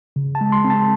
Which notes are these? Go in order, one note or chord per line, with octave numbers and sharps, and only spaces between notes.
C#3
A5
G#3
C6
C4
A5